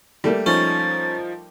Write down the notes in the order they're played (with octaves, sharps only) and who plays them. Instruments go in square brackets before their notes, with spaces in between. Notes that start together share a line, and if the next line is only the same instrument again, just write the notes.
[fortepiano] G3 A3 A#3
[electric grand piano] F3 D#4 [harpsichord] C#4 [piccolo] A6